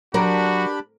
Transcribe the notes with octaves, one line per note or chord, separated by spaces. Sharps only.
F#3 D4 F#4 G4 A#4 B5